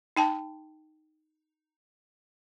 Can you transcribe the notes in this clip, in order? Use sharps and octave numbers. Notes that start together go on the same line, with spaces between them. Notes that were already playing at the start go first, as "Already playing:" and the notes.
D#4 G5 A5